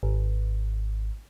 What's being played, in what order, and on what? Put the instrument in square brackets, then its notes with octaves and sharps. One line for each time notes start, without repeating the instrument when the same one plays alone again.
[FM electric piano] G#1